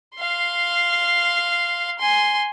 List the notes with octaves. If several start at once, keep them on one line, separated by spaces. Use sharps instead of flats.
F5 C6
G#5 C6